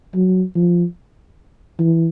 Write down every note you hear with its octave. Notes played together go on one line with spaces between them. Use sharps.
F#3
F3
E3